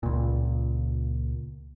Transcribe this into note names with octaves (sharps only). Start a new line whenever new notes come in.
C#2 A#2